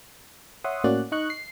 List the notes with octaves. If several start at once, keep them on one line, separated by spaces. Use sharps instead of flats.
C#5 E5 F#5 C6 D#6
A2 A#3 C#4 F#4 D5 F#6
D#4 D#5 C#6 F#6
C7